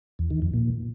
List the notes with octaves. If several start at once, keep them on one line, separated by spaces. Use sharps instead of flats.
E2
D#3
F2
A#2